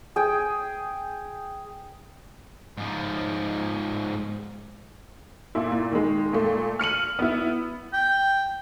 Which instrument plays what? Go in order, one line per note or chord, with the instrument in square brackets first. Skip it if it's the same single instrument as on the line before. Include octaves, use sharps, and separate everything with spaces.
[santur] G#4 G5
[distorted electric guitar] G#2 F3
[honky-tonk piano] A#2 E4
A#2
D#3 G#3
A#2 A3
F6 C#7 D#7 F#7
B3 E4
[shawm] G5